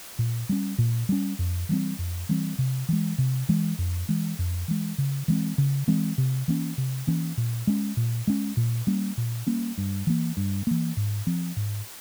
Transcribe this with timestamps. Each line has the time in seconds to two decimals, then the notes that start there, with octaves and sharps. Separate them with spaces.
0.19 A#2
0.49 G3 C#4
0.78 A#2
1.09 G3 C#4
1.39 F2
1.69 E3 G3 C4
1.99 F2
2.29 E3 G3 C4
2.58 C3
2.89 E3 G#3
3.18 C3
3.49 E3 G#3
3.78 F2
4.09 E3 G#3
4.39 F2
4.68 E3 G#3
4.98 C#3
5.28 E3 G#3 C4
5.58 C#3
5.88 E3 G#3 C4
6.18 C3
6.48 E3 A#3 C#4
6.78 C3
7.07 E3 A#3 C#4
7.37 A#2
7.67 G#3 C#4
7.97 A#2
8.27 G#3 C#4
8.57 A#2
8.87 G3 A#3 C#4
9.17 A#2
9.47 G3 A#3 C#4
9.78 G2
10.07 E3 A#3
10.37 G2
10.67 E3 A#3
10.97 G#2
11.27 F3 C4
11.57 G#2